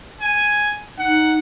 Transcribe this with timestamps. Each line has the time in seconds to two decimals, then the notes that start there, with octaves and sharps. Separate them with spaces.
0.21 G#5
0.99 D#4 F#5